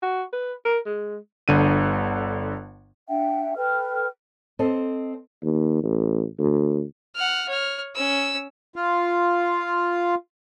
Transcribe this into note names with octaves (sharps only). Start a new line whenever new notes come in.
F#4
B4
A#4
G#3
G1 D3 D#7
D4 E5 F#5 G5
A4 B4 G5 F6
C4 A4 C5 D#5
D#2
A1
D2
F#5 F6
C#5 F6
C#4 E6
F4 F5